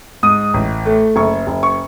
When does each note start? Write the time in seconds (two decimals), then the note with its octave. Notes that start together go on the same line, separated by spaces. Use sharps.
0.23 G#2 D#6
0.54 A1
0.86 A3
1.16 F#1 C#6
1.47 F#1
1.63 C#6